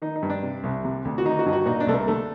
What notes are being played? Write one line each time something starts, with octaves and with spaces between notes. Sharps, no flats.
D#3 D#4
D#4
G2
D4
C3
C2
C3
D2
F#4
D#3 D#4
F#4
G2 D#4
F#4
A#2 D#4
D4
C2 A3
A#3
D3 A3